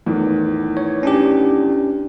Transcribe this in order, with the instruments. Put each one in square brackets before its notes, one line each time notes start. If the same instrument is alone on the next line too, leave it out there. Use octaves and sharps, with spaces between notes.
[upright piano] E2 A2 D#3
[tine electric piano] C#5
C#4 D4 G4